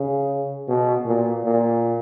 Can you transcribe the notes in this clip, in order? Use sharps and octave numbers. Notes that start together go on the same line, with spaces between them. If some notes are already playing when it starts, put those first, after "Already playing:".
Already playing: C#3
B2
A#2
A#2